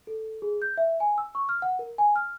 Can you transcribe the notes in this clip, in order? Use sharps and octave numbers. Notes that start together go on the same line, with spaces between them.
A4
G#4
G6
E5
G#5
E6
C#6
F6
F#5
A#4
G#5
F6